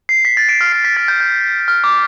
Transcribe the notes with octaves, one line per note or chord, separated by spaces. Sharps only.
C7
B6
A6
B6 D7
F6
C7
B6
A6
G6
G6
F6
D6